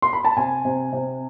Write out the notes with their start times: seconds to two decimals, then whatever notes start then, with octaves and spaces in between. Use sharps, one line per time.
0.02 C6
0.13 B5
0.25 A5
0.36 C3 G#5
0.65 C3
0.93 C3